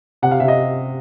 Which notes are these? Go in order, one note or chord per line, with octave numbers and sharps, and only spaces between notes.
C3 F#5
F5
C3 E5
D#5